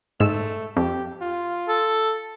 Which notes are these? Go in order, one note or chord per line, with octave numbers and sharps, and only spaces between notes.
G#2 A3 E6
F2 G4
F4
A4